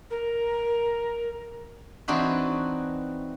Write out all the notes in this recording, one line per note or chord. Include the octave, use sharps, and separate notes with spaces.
A#4
E3 C4 D4 D#4 F#4 B4